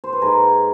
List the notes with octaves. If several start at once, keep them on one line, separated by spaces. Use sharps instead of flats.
C5
B4
G#2 G#4 A#4